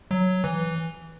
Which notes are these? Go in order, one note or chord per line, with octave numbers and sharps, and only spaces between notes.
F#3
E3